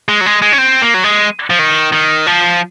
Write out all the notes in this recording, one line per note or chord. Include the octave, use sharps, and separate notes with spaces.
G#3
F#3
G#3
G#3
C#4
C4
A#3
F#3
G#3
F3
D#3
D#3
F3